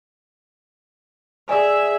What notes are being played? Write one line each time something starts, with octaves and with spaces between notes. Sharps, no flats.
G#4 D5 E5 G#5